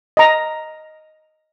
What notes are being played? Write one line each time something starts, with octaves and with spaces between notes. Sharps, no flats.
D#5 A#5